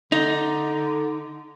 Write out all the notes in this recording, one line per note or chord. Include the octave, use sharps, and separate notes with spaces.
D3 D#4